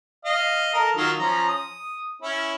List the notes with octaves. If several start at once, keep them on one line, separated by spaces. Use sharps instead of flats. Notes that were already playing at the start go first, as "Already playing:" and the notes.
D#5 F5
A4 A#4 A5
D#3 F#3 F4
F3 C#4 A#5
D#6
C#4 E4